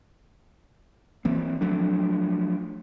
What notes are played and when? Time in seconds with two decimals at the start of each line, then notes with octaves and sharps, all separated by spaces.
1.25 E3 A#3 C4
1.61 F3 F#3 A3 D4